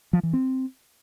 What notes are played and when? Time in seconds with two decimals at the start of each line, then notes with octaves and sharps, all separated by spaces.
0.13 F3
0.23 E3
0.33 C4